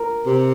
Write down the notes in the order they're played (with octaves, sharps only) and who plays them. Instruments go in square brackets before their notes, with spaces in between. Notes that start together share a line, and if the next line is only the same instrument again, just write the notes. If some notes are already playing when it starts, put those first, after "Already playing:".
Already playing: [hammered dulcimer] A#4
[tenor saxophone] C3